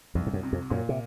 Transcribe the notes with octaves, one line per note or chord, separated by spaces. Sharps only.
C2 F2
G#2
F#2
C3
F2
F#2 A#2
C3